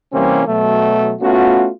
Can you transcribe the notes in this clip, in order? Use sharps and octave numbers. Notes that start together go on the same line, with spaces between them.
C3 E3 G3 A#3 C4 C#4
B2 F#3 A3
A3 B3 C#4 F4 F#4